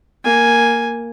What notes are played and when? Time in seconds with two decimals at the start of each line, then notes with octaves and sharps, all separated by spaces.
0.24 A#3 G#5